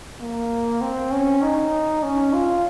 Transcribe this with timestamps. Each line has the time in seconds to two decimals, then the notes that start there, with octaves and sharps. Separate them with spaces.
0.21 A#3
0.82 C4
1.12 C#4
1.43 D#4
2.03 C#4
2.33 F4